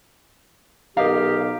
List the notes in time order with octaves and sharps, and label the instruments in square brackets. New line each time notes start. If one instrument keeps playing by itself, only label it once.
[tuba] B1 [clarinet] G4 [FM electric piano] A#4 D#5 A#5 [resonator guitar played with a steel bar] F5